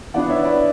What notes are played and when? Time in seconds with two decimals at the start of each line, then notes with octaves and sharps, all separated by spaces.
0.14 E3 B3 D4 D5 F#5
0.29 C#5 E5
0.45 B4 D5